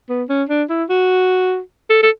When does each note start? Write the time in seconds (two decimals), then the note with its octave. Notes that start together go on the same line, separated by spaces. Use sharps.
0.09 B3
0.29 C#4
0.49 D4
0.70 E4
0.89 F#4
1.90 A4
2.03 A4